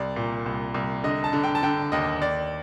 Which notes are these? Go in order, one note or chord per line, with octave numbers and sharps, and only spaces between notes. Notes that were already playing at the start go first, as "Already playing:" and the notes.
Already playing: C2 D5
A#2
C2
C2
D3 D#5
A5
D3
G5
A5
D3 G5
D#2 D#5
D#2 D5